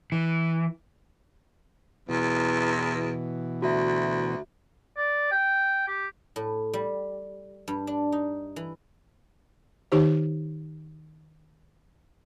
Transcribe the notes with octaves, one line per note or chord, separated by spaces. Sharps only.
E3
E2 B2 E3
D2 F#4 E5
D5
G5
G4
A2
G3
G2
D4
D#4
E3
D#3 D#4 G4 C5